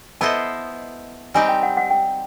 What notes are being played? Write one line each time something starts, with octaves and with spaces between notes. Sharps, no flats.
B3 E4 A4 C5 D#5 A5
G3 C4 D#4 G4 G#5
G5
F#5
F#5
G5